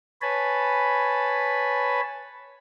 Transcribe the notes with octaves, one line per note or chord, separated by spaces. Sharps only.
B4 C#5 G#5 A5 B5